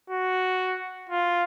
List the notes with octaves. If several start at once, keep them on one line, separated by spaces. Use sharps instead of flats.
F#4
F4